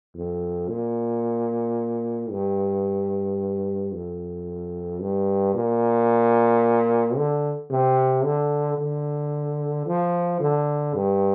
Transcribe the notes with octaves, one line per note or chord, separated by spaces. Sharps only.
F2
A#2
G2
F2
G2
A#2
D3
C3
D3
D3
F3
D3
G2